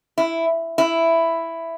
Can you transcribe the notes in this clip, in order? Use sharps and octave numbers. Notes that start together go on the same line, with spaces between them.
E4
E4